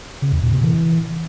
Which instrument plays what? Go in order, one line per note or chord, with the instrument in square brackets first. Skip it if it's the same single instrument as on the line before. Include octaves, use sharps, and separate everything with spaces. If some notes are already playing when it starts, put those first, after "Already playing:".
[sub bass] C#3
E2
A#2
C3
E3